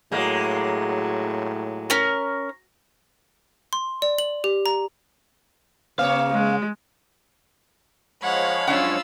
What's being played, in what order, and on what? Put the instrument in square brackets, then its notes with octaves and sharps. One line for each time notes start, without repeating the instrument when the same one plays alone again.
[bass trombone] A2 [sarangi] F#3 [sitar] G#3 A#3
[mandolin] C#4 A#4
[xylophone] C6
D5
F#7
G4
A#5
[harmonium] C#3 [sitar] A#3 C#5 [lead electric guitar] F5
[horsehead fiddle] G#3
[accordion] F3 G#3 C#5 [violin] F5 B5 [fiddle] F#5
[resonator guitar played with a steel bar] F#2 D4 F#5 [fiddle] F4 E6